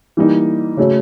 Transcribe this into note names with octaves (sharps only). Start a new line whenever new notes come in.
E3 G3 A#3 D#4
C#3 F#3 A3 C#4